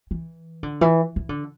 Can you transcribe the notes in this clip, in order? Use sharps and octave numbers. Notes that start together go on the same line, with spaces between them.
E3
D3
E3
E3
D3